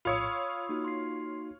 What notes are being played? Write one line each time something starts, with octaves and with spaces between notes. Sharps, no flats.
A#1 A2 F4 C#5 B5 D#6 E6 C#7
C#6
A#3 D#4 F#4
C6 C7